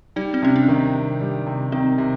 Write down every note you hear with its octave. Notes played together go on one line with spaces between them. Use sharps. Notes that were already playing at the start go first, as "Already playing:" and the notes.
G3 D#4
C4
C3 C#4
D4
D#3
C3
G3
C3
D#3 C4
C3